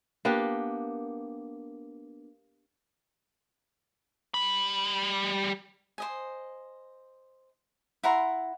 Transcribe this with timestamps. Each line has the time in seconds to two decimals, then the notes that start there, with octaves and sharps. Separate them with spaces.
0.25 A#3 B3 D4 G4
4.34 G3 B5
5.98 C5 D#5 G#5
8.04 E4 F#5 A#5 C6